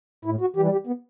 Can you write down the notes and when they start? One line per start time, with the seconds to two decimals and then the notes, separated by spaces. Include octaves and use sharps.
0.25 A2 E4
0.41 F#4
0.56 E3 G3 G4
0.72 G4
0.87 B3